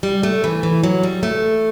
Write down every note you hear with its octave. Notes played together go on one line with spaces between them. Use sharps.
G3
A3
E3
E3
F#3
G3
A3